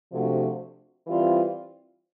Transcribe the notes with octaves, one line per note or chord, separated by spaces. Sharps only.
C3 F3 A3 D4 F#4
E3 G3 C4 F4